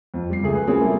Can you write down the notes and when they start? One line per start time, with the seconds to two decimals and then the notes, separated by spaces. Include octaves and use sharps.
0.14 F2
0.30 G3 C7
0.43 C#2 A3 G#4
0.55 B4
0.67 F#3 A#3 C4 C#4 F4 G#4
0.80 G3 A#3 E4 A4